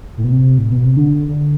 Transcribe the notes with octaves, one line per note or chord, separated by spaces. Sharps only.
A2
B2
C3
A2
B2
C3
D3
D3